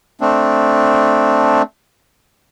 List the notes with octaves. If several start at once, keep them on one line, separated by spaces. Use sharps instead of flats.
A3 C4 D4